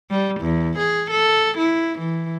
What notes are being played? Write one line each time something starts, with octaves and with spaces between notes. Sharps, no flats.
G3
E2
G#4
A4
E4
E3